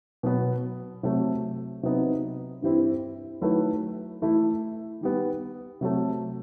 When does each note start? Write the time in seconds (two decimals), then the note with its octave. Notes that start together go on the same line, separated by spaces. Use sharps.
0.23 B2 F#3 B3
1.03 C3 F#3 A3
1.83 C3 F#3 B3 D#4
2.62 G2 E3 G3 C4 E4
3.42 D#3 F#3 A3 E4 B4
4.22 E3 A3 E4
5.01 D#3 G3 B3
5.81 C3 F#3 A3